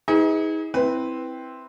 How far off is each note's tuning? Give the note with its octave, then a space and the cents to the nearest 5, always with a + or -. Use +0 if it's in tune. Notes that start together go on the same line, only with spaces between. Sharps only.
D#4 +40 G#4 -20 B4 +15
C4 +0 E4 -10 B4 +0